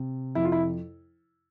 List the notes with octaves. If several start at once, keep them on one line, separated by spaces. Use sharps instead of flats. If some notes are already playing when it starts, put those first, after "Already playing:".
Already playing: C3
F2 E4
F4
E4